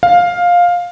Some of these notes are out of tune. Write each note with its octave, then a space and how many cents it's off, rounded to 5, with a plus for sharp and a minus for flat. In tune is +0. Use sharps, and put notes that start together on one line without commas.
F5 +10